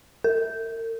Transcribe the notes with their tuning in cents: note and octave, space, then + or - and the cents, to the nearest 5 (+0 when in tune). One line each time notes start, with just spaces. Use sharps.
A#4 -45